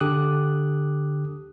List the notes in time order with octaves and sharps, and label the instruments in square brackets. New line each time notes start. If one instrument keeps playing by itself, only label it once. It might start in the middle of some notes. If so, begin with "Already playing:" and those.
[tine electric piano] D3 G4 A4 D6 D#6 F#6